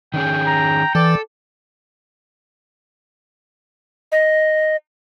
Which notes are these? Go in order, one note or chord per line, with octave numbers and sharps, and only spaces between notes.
D#3 C#4 G#4 G5
A#5
E3 A4 D5
D#5